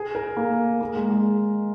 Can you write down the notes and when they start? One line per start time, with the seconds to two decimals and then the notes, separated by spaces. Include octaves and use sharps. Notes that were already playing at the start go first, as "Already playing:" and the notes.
Already playing: G#4
0.15 A#4
0.37 A#3
0.81 A#3
0.96 G#3
1.10 G#3